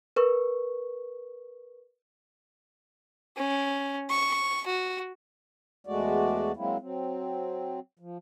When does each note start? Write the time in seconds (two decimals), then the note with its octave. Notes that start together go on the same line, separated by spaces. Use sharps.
0.16 A#4 B4 C#6
3.37 C#4
4.10 C#6
4.67 F#4
5.87 E2 G#3 A3 F#4 D5
6.57 F#3 G#3 A#3 C4 E4
6.80 F#3 C4
7.99 F3